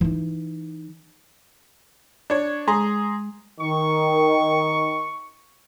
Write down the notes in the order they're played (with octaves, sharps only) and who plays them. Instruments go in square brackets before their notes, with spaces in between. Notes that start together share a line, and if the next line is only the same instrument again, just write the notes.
[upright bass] E3 D#4
[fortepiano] D4 C#5
[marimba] G#3 [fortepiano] G#4 A#5 C6
[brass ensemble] D#3 [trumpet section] C#6